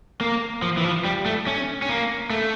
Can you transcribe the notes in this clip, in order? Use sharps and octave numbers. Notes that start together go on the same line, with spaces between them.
A#3
F3
E3
F3
G3
A3
C#4
C#4
A#3
A3